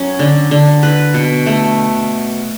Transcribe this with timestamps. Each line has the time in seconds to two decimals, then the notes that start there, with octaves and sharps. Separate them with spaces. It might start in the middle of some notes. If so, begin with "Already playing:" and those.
Already playing: F#3 C#4
0.19 D3
0.51 D3
0.83 B4
1.14 B2
1.46 A3